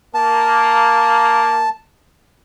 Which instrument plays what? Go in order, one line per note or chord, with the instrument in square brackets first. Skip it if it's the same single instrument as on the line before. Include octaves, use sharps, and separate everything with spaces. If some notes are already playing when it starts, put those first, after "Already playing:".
[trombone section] A#3 [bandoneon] A5